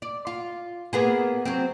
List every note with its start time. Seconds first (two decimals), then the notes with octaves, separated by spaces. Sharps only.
0.02 D5
0.27 F4
0.93 A#3 B3 G#4
1.45 F#3 C4